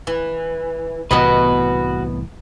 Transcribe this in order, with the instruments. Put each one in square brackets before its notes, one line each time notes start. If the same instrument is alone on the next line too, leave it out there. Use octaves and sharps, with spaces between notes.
[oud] E3
[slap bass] C2 A2 E3 [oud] B3 D#5 [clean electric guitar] F#4 B4